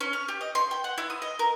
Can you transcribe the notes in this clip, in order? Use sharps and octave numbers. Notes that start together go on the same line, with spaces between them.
C#4
F6
G4
D#5
C6
G5
F#5
E4
D#6
D#5
A#4